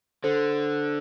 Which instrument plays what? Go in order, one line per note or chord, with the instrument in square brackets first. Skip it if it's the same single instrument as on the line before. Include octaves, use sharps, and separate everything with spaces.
[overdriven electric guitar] D3 [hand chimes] A4 C5